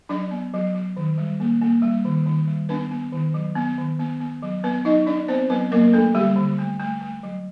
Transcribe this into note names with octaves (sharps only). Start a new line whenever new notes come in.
F#3 D4 D5
B3
F#3
F#3
D#3
G3
A#3
A#3
G3
D#3
D#3
G3
B3 D4 B4
B3
D#3
F#3
B3
D#3
B3
B3
F#3
B3 B4
F#3 D#4 D#5
D4 D5
B3 C4 C5
F#3 B3 B4
F#3 A#3 A#4
A3 D4 A4
D3 G3 G4
D3
A3
A3
A3
F#3